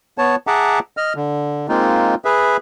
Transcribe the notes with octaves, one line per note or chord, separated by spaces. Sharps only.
B3 C#5 A5
G#4 E5 F#5 A5 A#5 D6
D#5 F6
D3
G#3 A#3 C4 D#4 F4
G#4 B4 E5